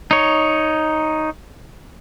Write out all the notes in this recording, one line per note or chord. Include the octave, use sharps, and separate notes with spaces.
D#4 C#5